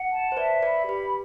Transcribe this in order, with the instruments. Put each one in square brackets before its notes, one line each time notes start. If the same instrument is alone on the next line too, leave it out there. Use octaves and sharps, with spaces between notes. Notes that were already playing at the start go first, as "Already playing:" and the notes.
Already playing: [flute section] F#5
A5
[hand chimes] C5
[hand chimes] B4 D5 [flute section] E5
[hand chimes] B4 D5 [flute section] B5
[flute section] G4 [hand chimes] B4